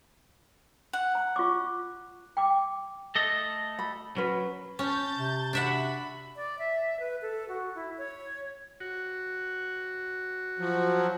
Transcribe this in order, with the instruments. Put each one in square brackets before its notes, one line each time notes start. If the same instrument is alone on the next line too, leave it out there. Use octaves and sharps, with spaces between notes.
[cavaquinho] F#5
[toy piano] A#5
F4 C#6 D6
G5 D6
[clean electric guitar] A3 A4 D#5
[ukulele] B5
[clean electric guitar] F#3 [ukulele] C#4 F#4 B4
[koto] C#4 [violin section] A5 G6 A6
[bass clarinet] C3
[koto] D4 E5 F#5 [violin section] F#4 B5
[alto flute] D5
E5
B4
A4
F#4
E4
C#5
[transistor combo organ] F#4
[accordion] F3 F#3